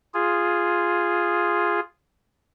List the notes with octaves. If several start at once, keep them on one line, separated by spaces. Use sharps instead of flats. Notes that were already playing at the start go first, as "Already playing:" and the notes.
F4 G#4